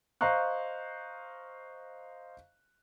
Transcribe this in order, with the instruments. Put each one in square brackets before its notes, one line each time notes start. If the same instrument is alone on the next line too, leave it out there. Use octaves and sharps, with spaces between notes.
[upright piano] C5 D#5 F5 A#5 C#6 F#6